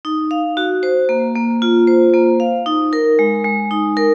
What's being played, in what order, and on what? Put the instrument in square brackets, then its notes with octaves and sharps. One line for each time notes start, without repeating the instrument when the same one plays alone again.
[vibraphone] D#4
F5
F#4
C5
A#3
A#3
F4
C5
A#3
F5
D#4
A#4
G#3
G#3
D#4
A#4